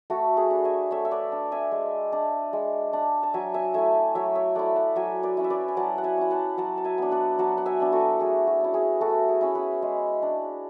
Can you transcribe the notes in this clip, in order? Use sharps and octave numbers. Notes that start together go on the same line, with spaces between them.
A3 F#4 A4
G#4 B4
D4
E5 G#5
A3 C#5 E5
E5
B4 D5
D4
E5 G#5
G#3
D4
G#3
D4
A5
F#3 E5 G#5
E5 G#5
A3 E4 E5 G#5
F#3 C#5 E5
C#5 E5
A3 E4 D5 F#5
F#5 A5
F#3 E5 G#5
B4 D5
C#4 E4
E5
B4 D5
G#5
F#3 F#5 A5
F#5
E5 G#5
C#4 E4
F#5 A5
F#3 F#5 A5
A5
E5 G#5
B3 D4
D5 F#5
F#3 F#5 A5
F#5
E5 G#5
B3 D4
F#4 A4
A3 G#4
F#4
C#4 E4
G#4
A3 F#4 A4
G#4
C#4 E4
G#4 B4
G#3
D4